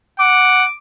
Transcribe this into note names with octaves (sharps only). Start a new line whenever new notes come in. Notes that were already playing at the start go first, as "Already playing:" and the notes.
F#5 D6